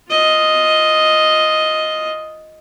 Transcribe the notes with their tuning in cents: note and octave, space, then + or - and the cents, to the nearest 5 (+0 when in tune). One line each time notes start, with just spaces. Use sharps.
F4 +0 D#5 +5